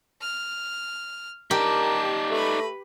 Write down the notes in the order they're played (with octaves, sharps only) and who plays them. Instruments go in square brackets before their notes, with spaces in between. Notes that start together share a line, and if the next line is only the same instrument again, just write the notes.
[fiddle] F6
[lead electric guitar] D#4 D5 [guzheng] G4 [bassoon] A#4 [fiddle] A5
[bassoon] A3 [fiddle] B4 B5